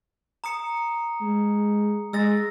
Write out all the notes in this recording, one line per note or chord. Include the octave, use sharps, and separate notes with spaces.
A#5 D#6 C#7
G#3
G#3 E6 A6 A#6